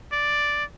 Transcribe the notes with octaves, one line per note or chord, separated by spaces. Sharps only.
D5